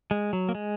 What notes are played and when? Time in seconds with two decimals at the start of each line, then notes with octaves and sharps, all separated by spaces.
0.11 G#3
0.33 F#3
0.49 A#3
0.55 G#3